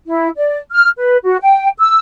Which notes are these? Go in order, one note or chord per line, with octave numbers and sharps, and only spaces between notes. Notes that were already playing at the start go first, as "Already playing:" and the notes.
E4
D5
F6
B4
F#4
G5
E6